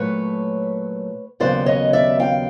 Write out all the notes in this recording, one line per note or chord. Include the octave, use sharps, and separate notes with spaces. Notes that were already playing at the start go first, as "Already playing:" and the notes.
Already playing: A#2 F#3 A3 B4 C#5
D#2 C#3 F#3 B3 C5 D5
C#5 D#5
D5 E5
F5 G5